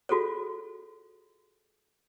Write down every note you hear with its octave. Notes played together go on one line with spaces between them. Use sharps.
F4 F#4 G#4 A4 C#5